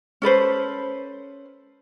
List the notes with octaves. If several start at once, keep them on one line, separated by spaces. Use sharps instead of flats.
C#4 A4 B4 C5